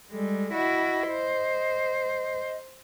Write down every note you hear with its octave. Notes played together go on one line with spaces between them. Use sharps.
G3 G#3 A4
E4 F#4 D#5
C5